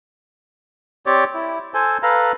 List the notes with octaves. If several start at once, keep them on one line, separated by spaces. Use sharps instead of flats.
C4 G4 C#5 D5
E4
A4 C5 G#5
A4 B4 F5 A#5